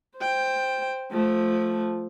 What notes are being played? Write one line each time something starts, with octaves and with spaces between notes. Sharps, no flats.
C5 G5
F3 A3